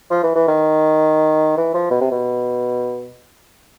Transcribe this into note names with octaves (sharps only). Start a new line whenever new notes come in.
F3
E3
E3
D#3
E3
F3
B2
C3
B2